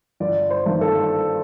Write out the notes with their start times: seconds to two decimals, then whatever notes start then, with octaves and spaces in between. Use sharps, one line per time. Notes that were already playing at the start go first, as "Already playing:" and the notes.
0.20 G1 D5
0.51 C5
0.66 G2 D#3 A#3
0.81 A4